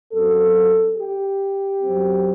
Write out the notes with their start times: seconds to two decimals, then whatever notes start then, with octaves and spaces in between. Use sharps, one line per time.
0.12 F#2 F#3 C4 A4
0.97 G4
1.82 F#2 F#3 C4